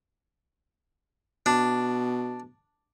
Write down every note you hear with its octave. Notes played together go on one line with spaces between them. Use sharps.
B2 D4